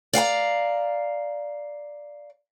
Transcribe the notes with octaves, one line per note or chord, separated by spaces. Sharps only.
D5 F5 F#5 A#5